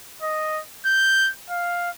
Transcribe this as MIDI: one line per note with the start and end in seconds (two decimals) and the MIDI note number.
0.22 0.61 75
0.86 1.30 91
1.50 1.90 77